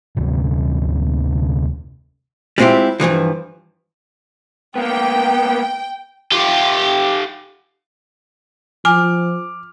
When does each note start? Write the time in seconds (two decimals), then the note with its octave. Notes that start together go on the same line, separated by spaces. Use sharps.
0.17 F1 D2 C3
2.58 G3 G#3 C4 E4 F4 G4
3.00 G2 B2 E3 F3
4.76 A#3 B3 G5
6.32 F4 G4
8.85 F3 G#5 D6 F6